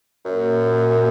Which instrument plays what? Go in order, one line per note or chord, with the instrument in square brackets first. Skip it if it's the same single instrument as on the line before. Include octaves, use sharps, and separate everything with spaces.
[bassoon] F#2 [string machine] A#2